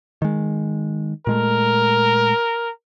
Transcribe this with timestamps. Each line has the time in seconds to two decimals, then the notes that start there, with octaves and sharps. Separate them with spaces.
0.22 D#3 G#3
1.27 A#2 G#3 A3 A#4